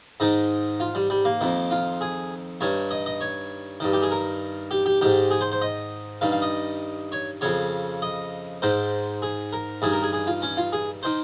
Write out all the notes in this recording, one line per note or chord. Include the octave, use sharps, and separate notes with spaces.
G#2 D#3 D#4
F4
G3
G3
A#3
F2 D#3
F4
G#4
G2 D#3 C#5
D#5
D#5
C#5
G2 D#3
G4
G#4
A#4
G4
G4
G#2 D#3 G4
G#4
C5
C5
D#5
G2 D#3 F5
F5
D#5
C#5
F2 C#3 C#5
D#5
G#2 D#3 C5
G#4
A#4
G2 D#3 G#4
A#4
G#4
G#4
F4
C#4
F4
G#4
D#3 C5